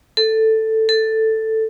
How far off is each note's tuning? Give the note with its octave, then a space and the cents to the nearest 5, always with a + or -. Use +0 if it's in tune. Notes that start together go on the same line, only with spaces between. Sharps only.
A4 +5
A4 +5